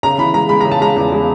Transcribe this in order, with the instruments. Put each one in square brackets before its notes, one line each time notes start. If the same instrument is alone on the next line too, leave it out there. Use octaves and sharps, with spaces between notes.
[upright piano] C#3 A#5
E3 B5
G#3 A#5
G#3 B5
C#3 A#5
A5
G#3 A#5
E2
G#3